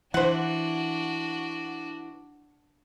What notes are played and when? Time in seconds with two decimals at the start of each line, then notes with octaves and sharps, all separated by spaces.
0.14 E3 D4 F#4 C5 F#5